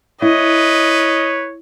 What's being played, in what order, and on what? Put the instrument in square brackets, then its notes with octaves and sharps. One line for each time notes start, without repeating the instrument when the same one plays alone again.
[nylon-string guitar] E4 [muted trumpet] B4 [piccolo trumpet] C#5 [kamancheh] D#5